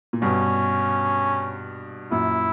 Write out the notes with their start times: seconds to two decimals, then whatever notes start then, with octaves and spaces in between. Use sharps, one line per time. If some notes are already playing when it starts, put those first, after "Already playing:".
0.13 A#2
0.22 G2 B2 C#4
2.11 F#2 A#2 E4